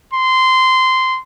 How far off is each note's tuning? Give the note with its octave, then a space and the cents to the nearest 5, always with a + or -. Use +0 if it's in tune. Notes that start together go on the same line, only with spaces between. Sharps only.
C6 -15